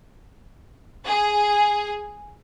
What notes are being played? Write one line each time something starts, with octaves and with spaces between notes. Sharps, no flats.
G#4